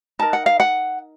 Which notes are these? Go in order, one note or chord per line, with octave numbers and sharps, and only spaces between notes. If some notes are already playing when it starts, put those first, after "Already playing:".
D#4 A#4 A5
F#5
F5
F#5